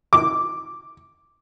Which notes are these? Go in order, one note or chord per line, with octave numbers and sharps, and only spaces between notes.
D6